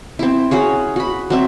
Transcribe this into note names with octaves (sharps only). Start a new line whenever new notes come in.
C4 E4
C#4 F#4 G#4 C#5
F#4 B5
F#3 C4 E5